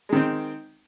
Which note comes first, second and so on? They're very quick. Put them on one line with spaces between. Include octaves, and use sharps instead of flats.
G#3 D#3 C4